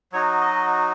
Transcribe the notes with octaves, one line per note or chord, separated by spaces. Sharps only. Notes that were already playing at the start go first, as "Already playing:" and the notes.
F#3 D#4 F#4 C#5
D#5